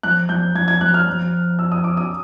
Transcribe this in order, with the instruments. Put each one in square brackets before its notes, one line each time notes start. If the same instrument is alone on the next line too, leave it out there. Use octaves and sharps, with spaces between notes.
[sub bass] F3 [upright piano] F#6
[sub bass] F3 [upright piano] G6
[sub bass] F3 [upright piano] G#6
[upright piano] G#6
[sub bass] F3 [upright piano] F#6
[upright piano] F6
[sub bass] F3
[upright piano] E6
D#6
D6
D#6